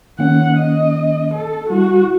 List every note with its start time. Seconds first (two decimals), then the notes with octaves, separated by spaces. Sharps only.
0.19 D#3 A#3 C#4 F#5
0.57 D#5
1.34 A4
1.70 G3 E4 F#4